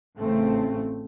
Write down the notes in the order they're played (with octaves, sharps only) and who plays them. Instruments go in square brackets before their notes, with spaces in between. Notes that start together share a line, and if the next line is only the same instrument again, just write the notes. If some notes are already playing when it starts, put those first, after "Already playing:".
[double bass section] A1 A2 C#3 A3 C4